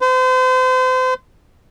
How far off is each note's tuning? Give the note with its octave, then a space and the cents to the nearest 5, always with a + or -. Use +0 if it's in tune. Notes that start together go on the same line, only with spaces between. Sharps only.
C5 -35